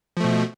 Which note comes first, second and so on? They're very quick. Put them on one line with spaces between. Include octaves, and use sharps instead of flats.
F3 A3 B2